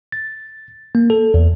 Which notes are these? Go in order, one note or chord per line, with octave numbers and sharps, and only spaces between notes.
A6
A#3
A4
E2